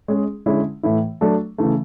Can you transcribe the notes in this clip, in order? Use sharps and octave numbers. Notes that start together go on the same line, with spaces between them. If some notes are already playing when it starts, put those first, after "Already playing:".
G#3 C#4 G#4
D3 G#3 C#4 E4
A2 E3 A3 E4
F#3 A3 D4 A4
C#3 E3 A3